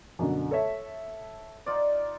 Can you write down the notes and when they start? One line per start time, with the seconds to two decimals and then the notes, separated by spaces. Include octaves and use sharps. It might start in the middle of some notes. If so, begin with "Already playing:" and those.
0.19 F#2 B2 D3
0.51 A4 C#5 E5
1.66 D#4 F4 D5